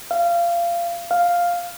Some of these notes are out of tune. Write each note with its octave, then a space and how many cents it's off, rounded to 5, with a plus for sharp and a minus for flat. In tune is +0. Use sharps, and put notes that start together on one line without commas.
F5 -25
F5 +0